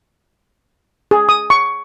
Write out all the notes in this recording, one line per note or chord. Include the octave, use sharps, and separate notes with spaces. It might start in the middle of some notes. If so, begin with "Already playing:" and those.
G#4
D#6
C#6